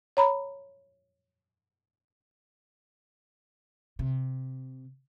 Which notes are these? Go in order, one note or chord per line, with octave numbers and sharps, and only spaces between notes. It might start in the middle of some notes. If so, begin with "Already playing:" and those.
C#5 A#5 B5
C3